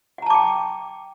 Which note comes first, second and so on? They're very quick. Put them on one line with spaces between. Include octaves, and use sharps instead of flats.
F#5 A#5 A5 D6 G5